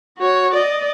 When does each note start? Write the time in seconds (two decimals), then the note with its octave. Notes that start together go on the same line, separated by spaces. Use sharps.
0.18 F#4 C#5
0.54 D5 D#5